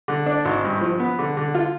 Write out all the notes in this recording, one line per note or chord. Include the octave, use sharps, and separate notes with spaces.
D3
D4
G#1
G2
F3
B3
D3
D3
F4